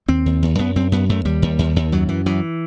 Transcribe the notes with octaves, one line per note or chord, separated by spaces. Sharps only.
D#2 C4
D#2
D#2
F#2 B3
F#2 C4
F#2 B3
F#2 A3
D#2 G3
D#2
D#2
D#2
F#2 F#3
F#2 E3
F#2 E3